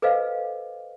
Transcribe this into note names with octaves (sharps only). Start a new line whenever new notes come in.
A4 B4 C5 D#5 F5